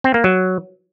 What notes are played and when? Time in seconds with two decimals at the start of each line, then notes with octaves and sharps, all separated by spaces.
0.04 C4
0.14 A#3
0.24 F#3